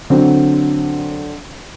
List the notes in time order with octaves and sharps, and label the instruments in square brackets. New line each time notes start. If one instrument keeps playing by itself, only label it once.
[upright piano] D3 F#3 C4